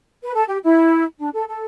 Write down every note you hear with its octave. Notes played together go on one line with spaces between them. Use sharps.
B4
A4
G4
E4
D4
A4
A4